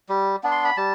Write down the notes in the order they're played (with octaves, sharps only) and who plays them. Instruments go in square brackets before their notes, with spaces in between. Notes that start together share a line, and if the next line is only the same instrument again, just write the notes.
[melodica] G3
B3 D4
C6
B5
G3 A5